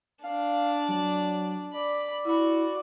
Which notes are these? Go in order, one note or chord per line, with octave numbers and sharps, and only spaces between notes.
D4 D5 F5
F#3
D5 B5
E4 F#4 B5